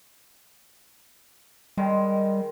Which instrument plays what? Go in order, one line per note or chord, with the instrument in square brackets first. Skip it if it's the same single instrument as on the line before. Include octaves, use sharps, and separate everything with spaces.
[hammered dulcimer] D#3 G#3 [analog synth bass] G3